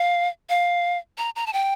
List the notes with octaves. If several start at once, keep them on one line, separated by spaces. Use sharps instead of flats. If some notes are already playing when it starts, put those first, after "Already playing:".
Already playing: F5
F5
A#5
A#5
A5
G5